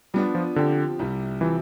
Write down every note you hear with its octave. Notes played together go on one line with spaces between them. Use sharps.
F3 G3 B3 D4
F3
D3 F3 C4 G4
C2 C3 G3
C3 E3 F3